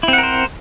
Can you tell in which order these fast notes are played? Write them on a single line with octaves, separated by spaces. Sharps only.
E4 C4 F#5 A#4 C5